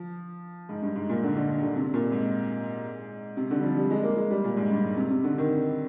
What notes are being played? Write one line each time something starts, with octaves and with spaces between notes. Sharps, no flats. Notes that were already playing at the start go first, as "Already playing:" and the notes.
Already playing: F3
G#2
G2
G#2
A#2
D3
D3
D3
C3
A#2
G#2
C3
D3
G3
F3
G3
G#3
A#3
G#3
G3
A#2
G#2
G2
G#2
C3
C3
D3
D#3